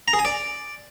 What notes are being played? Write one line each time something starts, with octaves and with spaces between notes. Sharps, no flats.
A#5
G#4
G#5
D5